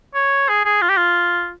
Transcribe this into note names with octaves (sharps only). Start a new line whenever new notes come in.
C#5
G#4
G#4
F4
G4
F4